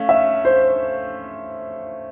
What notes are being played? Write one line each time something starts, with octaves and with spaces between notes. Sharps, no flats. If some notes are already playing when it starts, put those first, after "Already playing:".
Already playing: A3 C#4 F5
E5
C5